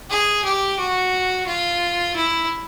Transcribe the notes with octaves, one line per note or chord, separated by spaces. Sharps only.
G#4
G4
F#4
F4
E4